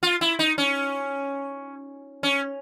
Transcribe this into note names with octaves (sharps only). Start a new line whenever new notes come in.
F4
E4
D#4
C#4
C#4